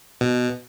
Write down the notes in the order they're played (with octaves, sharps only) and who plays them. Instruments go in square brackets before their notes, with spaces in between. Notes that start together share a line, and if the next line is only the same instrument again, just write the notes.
[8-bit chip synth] B2